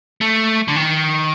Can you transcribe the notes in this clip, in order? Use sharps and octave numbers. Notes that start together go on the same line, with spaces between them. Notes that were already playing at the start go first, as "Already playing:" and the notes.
A3
D3
D#3